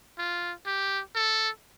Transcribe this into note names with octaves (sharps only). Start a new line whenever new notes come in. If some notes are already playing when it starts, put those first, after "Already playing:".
F4
G4
A4